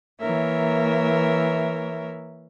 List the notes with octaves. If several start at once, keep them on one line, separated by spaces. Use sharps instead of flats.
E3 A#3 A#4 C#5 E5